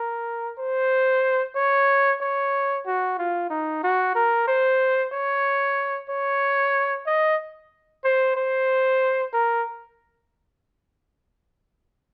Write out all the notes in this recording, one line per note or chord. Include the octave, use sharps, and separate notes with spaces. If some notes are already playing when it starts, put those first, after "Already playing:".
Already playing: A#4
C5
C#5
C#5
F#4
F4
D#4
F#4
A#4
C5
C#5
C#5
D#5
C5
C5
A#4